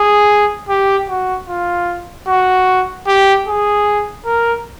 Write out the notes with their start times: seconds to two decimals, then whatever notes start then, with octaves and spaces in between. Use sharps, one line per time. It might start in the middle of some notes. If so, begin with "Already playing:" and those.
Already playing: G#4
0.69 G4
1.09 F#4
1.48 F4
2.28 F#4
3.07 G4
3.47 G#4
4.25 A#4